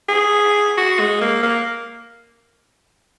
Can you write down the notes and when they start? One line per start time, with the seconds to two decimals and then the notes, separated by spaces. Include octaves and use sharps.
0.09 G#4
0.78 F#4
1.00 G#3
1.21 A#3
1.43 A#3